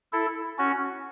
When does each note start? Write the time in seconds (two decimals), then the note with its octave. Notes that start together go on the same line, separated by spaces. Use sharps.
0.13 E4 A4
0.58 C#4 F#4